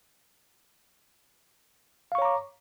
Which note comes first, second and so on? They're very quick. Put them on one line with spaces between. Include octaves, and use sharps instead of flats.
F5 C#6 C#5 A#5 D6